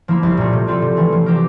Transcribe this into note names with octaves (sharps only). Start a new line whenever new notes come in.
F3 A#3 E4
C2
A#2 A3
C3
G3 C4 F4 A4
C3
E3 A3
F3
C4 G4 A#4